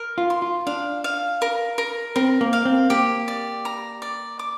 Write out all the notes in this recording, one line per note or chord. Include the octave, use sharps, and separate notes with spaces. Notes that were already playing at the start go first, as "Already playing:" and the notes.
Already playing: A#4
F4
C6
F4
D4 F5
F5
A#4
A#4
C4 A#4
A#3
F5
C4
A#3 G4
D5
A#5
D5
D6